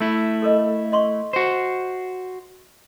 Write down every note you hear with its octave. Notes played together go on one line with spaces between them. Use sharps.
A3 E4
A4 A#4 D#5
D#5 C6 C#6
F#4 C5